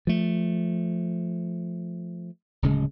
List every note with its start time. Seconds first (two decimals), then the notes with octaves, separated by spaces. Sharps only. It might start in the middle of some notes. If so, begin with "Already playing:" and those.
0.07 F3 A3
2.62 D1 C#3 G#3